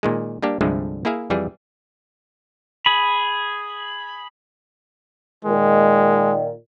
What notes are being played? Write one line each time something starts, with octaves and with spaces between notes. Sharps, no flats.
A#2 D#3 G#3
G3 A#3 D4 G4
C2 G2 D3 F3 G#3 A3
A#3 E4 G#4 E5 F5
F2 E3 G3 G#4
G#4 B5
A#2 D#3 G#3